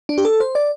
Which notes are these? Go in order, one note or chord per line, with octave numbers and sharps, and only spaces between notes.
D4
G4
A4
C5
D5